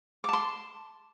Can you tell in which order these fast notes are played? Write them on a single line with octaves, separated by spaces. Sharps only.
D6 A5 C6